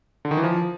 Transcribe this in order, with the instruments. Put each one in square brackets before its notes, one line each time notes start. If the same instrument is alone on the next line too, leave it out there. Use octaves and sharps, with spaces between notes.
[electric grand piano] D3
D#3
E3
F3